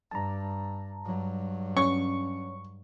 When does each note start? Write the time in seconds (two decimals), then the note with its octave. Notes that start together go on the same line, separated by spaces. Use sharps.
0.11 G2 A5 A#5
1.05 G2 F#3
1.77 C#4 C#6